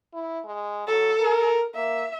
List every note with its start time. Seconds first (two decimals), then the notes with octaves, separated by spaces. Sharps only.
0.13 E4
0.45 G#3
0.87 F#3 A4
1.20 A#4
1.75 A#3 E5